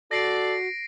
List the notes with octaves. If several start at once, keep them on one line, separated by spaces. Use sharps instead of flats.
F#4 A4 D5 A#6 C7 D7